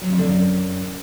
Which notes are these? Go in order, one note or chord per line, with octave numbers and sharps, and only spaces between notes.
F#3
F2
D3
F#2